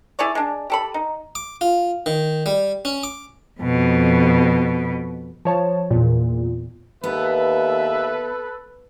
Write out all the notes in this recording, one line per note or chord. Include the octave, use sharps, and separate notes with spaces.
E4 G#4 C#5 D5
G#3 D4
G4 A4 B5
D#4
D6
F4
D#3
G3
C#4
D6
F2 B2
F3 C#5 A5
E2 A#2
D#2 B3 A4 B4 E5